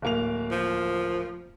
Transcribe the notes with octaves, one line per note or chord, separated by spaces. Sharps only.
D1 A#3 F7
F3